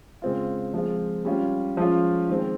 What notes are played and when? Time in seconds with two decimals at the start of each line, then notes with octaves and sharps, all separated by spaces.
0.22 C#3 G#3 C4 F4
0.74 F3 G#3 C4 F4
1.25 G3 C#4 F4
1.77 F3 G#3 C#4 F4
2.28 D#3 G#3 C4